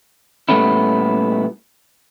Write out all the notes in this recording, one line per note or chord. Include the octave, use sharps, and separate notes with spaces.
A#2 G3 A3 B3 C#4 E4